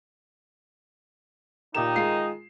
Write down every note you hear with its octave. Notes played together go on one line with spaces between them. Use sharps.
A#2 D#3 D#4 G4 E7
G#3 F4 C7